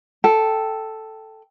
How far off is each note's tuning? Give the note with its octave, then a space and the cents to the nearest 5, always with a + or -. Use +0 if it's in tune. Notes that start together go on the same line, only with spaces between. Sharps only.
A4 +0 G5 +0